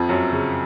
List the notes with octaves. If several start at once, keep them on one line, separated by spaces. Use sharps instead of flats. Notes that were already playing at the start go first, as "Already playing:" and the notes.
Already playing: F2 F3
F#2 F#3
C#3